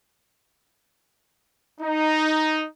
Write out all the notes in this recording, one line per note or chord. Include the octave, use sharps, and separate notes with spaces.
D#4